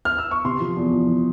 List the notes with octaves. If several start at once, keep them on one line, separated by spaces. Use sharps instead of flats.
F6
E6
C#6
C3 C6
F3
E2
F3
F3